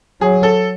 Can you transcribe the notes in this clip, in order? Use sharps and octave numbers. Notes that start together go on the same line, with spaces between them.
F#3 G#4
A4